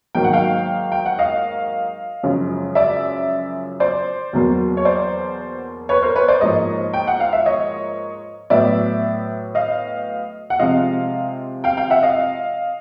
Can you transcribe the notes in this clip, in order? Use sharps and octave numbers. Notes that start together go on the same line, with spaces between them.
G#2 D#3 F#3 A#3 G5
F#5
F5 G5
G5
F#5
D#5 F5
F#2 C#3 F3 G#3
D5 E5
C5 D5
E2 B2 F#3 A#3
C#5
C5 D5
B4 C#5
A#4 C5
B4 C#5
C5 D5
G#2 F3 A#3 C#5 D#5
G5
F#5
F5
E5
C#5 D#5
A2 F#3 B3 D5 E5
D#5 F5
F#5
C3 F3 G#3 D#5 F5
F5 G5
F5 G5
E5 F#5
D#5 F5